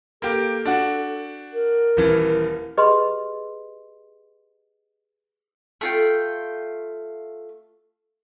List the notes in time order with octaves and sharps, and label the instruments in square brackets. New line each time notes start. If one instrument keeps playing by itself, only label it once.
[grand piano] A#3 G4 [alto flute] A4
[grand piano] D4 F#4
[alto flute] A#4
[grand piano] D#1 E3
[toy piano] G4 G#4 B4 D#5 B5 C6
[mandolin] A3 F4 G5